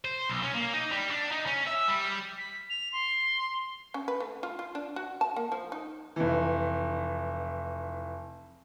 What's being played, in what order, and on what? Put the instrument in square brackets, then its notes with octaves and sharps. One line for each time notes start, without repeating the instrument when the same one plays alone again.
[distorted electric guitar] C5
B1
C#4
A#3
D#4
G3
D4
D#4
C#4
E5
G3
[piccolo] B6
F7
C6
[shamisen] C#4
B4
A3
F4
F4
D4
F#4
A5
A#3
F3
D#4
[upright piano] F1 E3